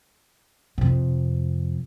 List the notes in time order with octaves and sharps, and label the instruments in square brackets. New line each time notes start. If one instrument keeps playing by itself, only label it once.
[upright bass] F2 C3